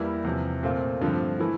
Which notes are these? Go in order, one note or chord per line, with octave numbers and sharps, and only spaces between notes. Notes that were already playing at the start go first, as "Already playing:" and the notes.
Already playing: E2 E3 G3 A#3 E4
E2 C3 F3
A#2 A3 C4 F4
G2 D3 F3 A3 C4
E3 A3 E4